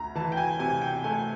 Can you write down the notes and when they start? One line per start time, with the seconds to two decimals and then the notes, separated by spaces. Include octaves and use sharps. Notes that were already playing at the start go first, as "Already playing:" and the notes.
Already playing: D2 A#5
0.15 E3 A5
0.32 G5
0.37 G#5
0.59 C3 G#5
0.82 G5
1.04 A3 G#5